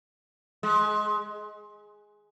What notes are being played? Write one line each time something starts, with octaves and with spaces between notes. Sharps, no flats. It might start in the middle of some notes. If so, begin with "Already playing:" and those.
G#3